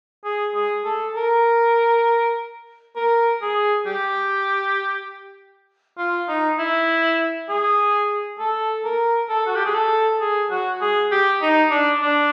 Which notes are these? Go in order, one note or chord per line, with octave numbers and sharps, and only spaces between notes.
G#4
G#4
A4
A#4
A#4
G#4
G4
F4
D#4
E4
G#4
A4
A#4
A4
F#4
G4
G#4
A4
G#4
F#4
G#4
G4
D#4
D4
D4